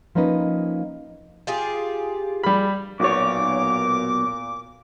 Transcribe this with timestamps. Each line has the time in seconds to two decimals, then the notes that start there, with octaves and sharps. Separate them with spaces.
0.15 F3 A#3 C#4 D#4 B4 D#5
1.47 F4 G4 G#4
2.43 G3 B5
3.00 B1 A#2 C#5 D6